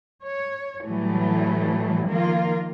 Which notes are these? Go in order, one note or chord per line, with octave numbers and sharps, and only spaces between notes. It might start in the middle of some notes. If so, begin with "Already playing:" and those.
C#5
A2 E3 F#3 G3 A3
D#3 F3 A#3 F4 A#4